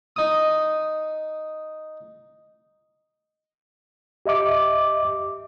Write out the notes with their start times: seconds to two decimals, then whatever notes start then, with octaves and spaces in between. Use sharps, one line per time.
0.16 D#4 D#6
4.26 G4 D#5 E5 D6